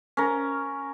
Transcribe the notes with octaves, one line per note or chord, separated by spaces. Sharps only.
C#4 A#4